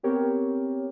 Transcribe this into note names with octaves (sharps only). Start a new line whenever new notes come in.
B3 C4 G4 A#4 C#5